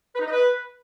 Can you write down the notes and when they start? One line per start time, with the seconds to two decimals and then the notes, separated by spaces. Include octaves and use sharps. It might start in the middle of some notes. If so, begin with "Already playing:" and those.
0.15 B4
0.21 D#4
0.27 D#5
0.32 B4